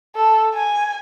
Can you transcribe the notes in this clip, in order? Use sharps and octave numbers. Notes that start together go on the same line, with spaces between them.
A4
G#5